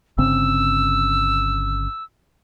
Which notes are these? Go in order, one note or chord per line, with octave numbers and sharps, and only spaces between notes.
G1 C#3 C4 E6